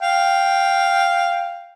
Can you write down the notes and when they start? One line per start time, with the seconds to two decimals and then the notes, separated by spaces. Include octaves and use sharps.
0.02 F5 G5